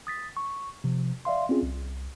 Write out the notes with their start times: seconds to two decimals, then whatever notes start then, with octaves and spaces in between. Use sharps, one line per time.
0.07 D#6 A6 B6
0.37 C#6
0.84 C3 F3
1.25 D5 E5 F5 C6
1.49 C4 C#4 F4 G#4
1.63 C2